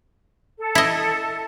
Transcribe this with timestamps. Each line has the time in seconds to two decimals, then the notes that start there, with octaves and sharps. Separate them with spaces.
0.58 A4
0.75 E4 D#5